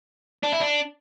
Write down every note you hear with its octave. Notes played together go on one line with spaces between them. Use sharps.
D4
E4
D4